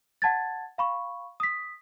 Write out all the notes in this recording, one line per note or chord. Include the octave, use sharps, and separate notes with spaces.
F#5 A5 G#6 A6
F5 B5 C#6
D#6 B6